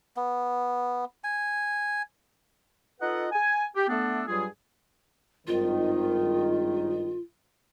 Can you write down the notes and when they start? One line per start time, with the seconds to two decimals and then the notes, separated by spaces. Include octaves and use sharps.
0.17 B3
1.24 G#5
3.01 D#4 F4 A4 B4 D#5 F#5
3.32 G#5
3.76 G4
3.89 A3 B3 D4 A4
4.27 G2 F#3 G3 F4 G#4
5.47 G#1 G2 D#3 F4